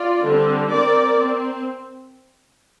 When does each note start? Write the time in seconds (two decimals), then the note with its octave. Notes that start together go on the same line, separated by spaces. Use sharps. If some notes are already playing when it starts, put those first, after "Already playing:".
Already playing: F4 D5
0.25 D3 G3 C4
0.71 C4 A#4 D5
1.17 C4